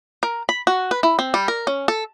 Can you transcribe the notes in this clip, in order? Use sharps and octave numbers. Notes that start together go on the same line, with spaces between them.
A#4
B5
F#4
B4
E4
C4
G3
A#4
C#4
A4